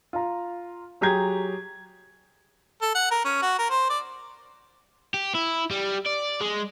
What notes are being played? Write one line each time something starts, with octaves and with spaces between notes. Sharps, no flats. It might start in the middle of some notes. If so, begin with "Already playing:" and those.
F4 A#5
F#3 G4 G#4 A#5 G#6
A4
F#5
A#4
C#4
F#4
A#4
C5
D5
G4
E4
G3
D5
G#3